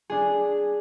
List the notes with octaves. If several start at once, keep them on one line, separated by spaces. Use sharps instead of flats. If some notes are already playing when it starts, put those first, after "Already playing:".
D4 G#4